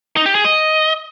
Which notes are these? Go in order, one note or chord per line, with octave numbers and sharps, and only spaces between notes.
D#4
G4
G#4
D#5